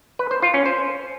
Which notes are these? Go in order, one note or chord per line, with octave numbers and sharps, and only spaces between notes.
B4
C5
F4
C#4
C5